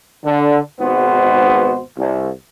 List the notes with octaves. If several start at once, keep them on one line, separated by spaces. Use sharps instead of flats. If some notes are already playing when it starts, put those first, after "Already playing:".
D3
G#1 G#2 B2 B3 C5
C2